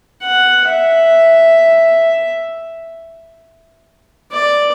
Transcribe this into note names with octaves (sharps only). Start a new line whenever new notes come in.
F#5
E5
D5